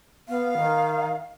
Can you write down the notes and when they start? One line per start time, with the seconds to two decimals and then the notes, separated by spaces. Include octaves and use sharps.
0.29 B3 F5
0.57 D#3